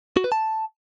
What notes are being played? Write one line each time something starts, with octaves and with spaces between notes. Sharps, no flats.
F#4
B4
A5